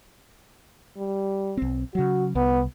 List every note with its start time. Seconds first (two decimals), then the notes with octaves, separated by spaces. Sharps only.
0.97 G3
1.57 B1 C4
1.95 C#3 F#3 F#4
2.35 C2 B3